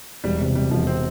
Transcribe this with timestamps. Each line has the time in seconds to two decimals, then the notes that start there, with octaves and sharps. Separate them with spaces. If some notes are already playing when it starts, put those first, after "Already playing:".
0.24 E1 G3
0.40 C3
0.56 C3 G3
0.71 E1 F3
0.87 C4